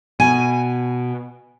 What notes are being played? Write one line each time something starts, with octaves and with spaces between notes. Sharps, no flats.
B2 G#5